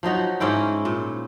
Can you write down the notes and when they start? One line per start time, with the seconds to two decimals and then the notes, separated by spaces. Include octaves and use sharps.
0.03 F3 F#3 D#4 F#4
0.40 G#2 C#4 E4 G5
0.85 A#2